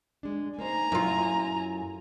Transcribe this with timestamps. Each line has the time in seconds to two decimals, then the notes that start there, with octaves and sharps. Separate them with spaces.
0.23 G#3 D4
0.58 A#3 D#4 C5 G#5 A#5
0.92 F#2 E4 F4 A4